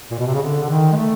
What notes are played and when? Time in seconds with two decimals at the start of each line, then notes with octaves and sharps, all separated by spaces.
0.11 A#2
0.19 B2
0.26 C3
0.34 C#3
0.42 D3
0.63 D3
0.70 D#3
0.92 G#3
0.96 A3